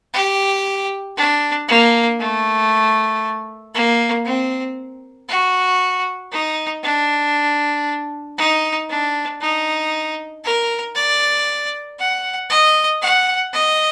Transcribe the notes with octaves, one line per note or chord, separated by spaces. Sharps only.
G4
D4
A#3
A3
A#3
C4
F#4
D#4
D4
D#4
D4
D#4
A#4
D5
F#5
D#5
F#5
D#5